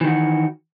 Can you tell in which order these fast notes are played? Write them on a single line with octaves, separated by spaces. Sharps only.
E3 D#3 F#4